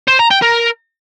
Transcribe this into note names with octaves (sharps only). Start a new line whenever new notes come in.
C5
A#5
G5
A#4